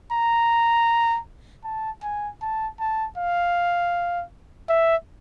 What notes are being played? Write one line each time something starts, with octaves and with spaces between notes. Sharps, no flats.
A#5
A5
G#5
A5
A5
F5
E5